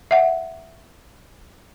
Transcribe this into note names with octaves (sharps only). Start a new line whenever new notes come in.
E5 F#5